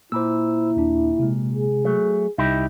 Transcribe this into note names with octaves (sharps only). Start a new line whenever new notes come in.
A#2 E4 C5 B5 E6
D#2 D4
C3 G#3
G#4
F#3 A3
C2 D#4 E4 G4